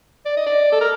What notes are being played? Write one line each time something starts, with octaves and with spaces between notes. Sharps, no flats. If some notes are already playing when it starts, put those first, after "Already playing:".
D5
D#5
D5
A4
A#4